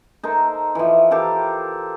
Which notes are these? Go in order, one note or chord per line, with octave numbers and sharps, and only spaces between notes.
D#4 A4 A#4 C5
E3 F3
G4 A4 A#4 F5